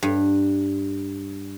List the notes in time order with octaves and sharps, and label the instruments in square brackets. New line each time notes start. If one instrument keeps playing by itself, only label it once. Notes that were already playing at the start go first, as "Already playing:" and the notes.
[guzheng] G2